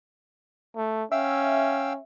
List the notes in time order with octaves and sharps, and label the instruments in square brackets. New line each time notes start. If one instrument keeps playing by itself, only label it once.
[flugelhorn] A3
[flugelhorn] C#4 [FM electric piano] E5 [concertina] F5 G5 E6